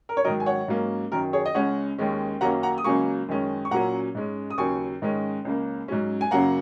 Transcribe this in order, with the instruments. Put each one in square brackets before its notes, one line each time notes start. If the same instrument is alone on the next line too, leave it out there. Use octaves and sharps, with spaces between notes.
[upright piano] A#4
C#5
G#2 D#3 F#3 A#4 D#5
G#5
C#5 F#5
G#2 F#3 A#3 C#4
F#2 D#3 F#3 A#4
G#4 C#5
D#5
C#2 C#3 G#3 C#4 C#5 F#5
D#2 D#3 G#3 C#4
F#2 D#3 F#3 A#3 C#4 F#5 A#5
F#5 A#5
D#6
C#2 C#3 F#3 A#3 G#5 C#6
F#2 D#3 G#3 C#4
C#6
A#2 F#3 C#4 F#5 A#5
G#2 G#3 C#4
D#6
D#2 C#3 F#3 G#5 C#6
G#2 D#3 G#3 C#4
C#2 C#3 A#3
G#2 F#3 C#4
G#5
F#2 C#3 F#3 A#3 F#5 A#5